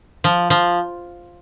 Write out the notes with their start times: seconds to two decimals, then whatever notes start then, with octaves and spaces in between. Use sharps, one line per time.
0.24 F3
0.50 F3